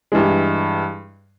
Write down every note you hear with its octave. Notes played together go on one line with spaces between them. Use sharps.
G2 E3 G#3